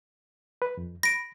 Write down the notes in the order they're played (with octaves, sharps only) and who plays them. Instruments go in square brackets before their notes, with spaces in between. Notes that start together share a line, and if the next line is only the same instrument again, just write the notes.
[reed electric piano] B4
F2
[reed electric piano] B5 [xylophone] A#6 D7